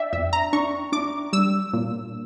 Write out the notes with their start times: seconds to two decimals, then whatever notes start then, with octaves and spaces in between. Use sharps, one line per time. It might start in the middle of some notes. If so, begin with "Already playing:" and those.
Already playing: D4 D5 E5 G5
0.13 F2 E5
0.33 A#5
0.53 D4 C#6
0.92 D4 D6
1.33 G3 E6
1.73 A#2